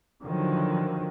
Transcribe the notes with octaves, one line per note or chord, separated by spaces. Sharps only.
D3 D#3 F3 F#3